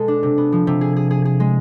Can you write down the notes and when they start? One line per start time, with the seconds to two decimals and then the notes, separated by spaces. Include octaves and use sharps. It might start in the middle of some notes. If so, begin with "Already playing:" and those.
Already playing: B2 G#3 A4
0.08 D4
0.23 C3
0.38 B3
0.52 F3
0.67 C3
0.81 G#4
0.96 G#4
1.11 G#4
1.25 G#4
1.40 G#3